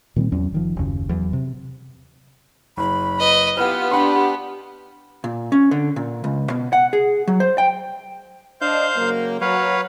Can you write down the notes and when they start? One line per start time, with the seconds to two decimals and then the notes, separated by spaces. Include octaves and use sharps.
0.16 A#2 D#3 G3 C4
0.32 E2 F#3 C#4
0.52 F#1 D#3 F3
0.77 F#1 D#2 C#3
1.09 E2 F#3
1.33 C3
2.77 F#1 B5
3.19 B4 D#5
3.57 B3 E4 F4 G4 B4 F#5 F6
3.91 D4 G4 F#5 B5 C6
5.24 A#2
5.52 C#4
5.71 D3
5.96 A#2
6.24 C#2
6.50 B2
6.73 F#5
6.93 G#4
7.27 F#3
7.40 C5
7.58 G5
8.61 D4 C5 D#5 F5 G6
8.97 C#3 F#3 A#3
9.41 F#3 B4 C#5 F5